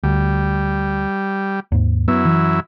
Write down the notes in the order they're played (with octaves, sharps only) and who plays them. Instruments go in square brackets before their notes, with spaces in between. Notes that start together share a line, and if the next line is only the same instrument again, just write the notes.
[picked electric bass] D2 [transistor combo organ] G3
[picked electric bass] D#2 G#2
[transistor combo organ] F#2 E4 [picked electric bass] B3
[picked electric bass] E3